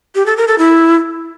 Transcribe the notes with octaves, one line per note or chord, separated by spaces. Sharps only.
G4
A4
A#4
A4
E4